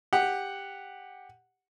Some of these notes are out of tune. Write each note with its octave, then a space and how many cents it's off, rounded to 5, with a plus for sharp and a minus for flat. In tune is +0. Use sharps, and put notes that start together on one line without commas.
G4 +10 F#5 +0